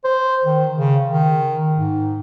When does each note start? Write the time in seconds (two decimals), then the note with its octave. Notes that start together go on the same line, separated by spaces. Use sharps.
0.04 C5
0.44 D#3
0.75 C#3
1.08 D#3
1.75 G#2